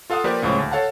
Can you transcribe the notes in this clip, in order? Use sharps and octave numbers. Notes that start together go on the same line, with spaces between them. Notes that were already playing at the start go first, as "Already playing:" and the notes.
F4 A4 F5 F#5 D#6
F3 A#3 G4 A#4 B4 D5
C#2 A2 C#3 F3 A#3
D2
A4 C#5 F5 F#5 A5